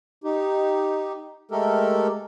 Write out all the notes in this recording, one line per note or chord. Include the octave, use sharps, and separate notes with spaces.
D#4 G4
G#3 A3 G4 A4 A#4